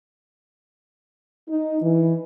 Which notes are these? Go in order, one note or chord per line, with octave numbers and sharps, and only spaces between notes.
D#4
E3